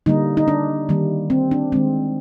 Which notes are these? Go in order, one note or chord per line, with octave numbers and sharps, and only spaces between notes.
D3 G3 A#3 D#4
D#4
D4
D#3 G3 A#3
C4
D4
D#3 G#3 C4